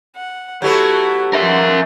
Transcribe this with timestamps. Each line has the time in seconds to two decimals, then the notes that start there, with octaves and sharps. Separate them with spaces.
0.16 F#5
0.62 F#3 A3 B3 E4 F#4 G4 A4
1.33 F3 G#3 A#4 E5